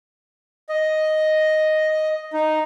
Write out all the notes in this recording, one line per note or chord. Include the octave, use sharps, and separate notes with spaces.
D#5
D#4